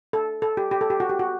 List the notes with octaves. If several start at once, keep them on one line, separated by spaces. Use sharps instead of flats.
A4
A4
G4
G4
A4
G4
F#4
G4
F#4